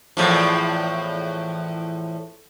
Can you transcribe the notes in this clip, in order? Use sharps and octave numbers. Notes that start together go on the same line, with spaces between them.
E2 A2 F3